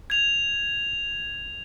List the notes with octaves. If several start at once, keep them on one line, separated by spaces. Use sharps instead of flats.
G#6 F7